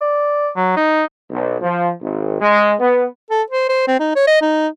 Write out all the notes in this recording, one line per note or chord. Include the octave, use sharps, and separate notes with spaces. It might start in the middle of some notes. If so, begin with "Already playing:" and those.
D5
F#3
D#4
B1
F3
G#1
G#3
B3
A4
C5
C5
C4
D#4
C#5
D#5
D#4